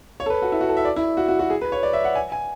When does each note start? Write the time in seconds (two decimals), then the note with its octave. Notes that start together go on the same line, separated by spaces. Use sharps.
0.20 C#5
0.26 A4
0.30 B4
0.42 F#4
0.52 E4
0.61 F#4
0.69 A4
0.77 E5
0.85 D5
0.96 E4
1.17 F#4
1.28 F#4
1.39 F#4
1.50 G#4
1.61 B4
1.72 C#5
1.83 D5
1.93 E5
2.05 F#5
2.15 G#5
2.32 G#5